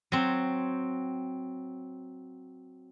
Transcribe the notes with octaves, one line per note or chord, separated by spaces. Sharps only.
F#3 C4